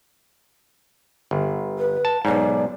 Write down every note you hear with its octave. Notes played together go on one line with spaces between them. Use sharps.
G1
B4
A5
B1 G#2 D5